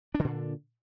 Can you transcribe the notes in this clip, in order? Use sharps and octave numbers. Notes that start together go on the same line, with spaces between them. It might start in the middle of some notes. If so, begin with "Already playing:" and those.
A#2 D3 D4